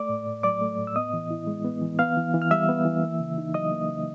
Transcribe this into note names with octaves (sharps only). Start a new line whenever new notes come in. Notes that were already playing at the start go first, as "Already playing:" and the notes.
Already playing: A3 D5 D6
A2
A2
F#3 D5 D6
A3
A2
E6
B3 D#5 D#6
E3
E4
G#3
B3
E3
B3 F5 F6
E3
E3
F6
G3 E5 E6
B3
E3
A#3
C#3
D#4
F#3 D#5 D#6
A#3
C#3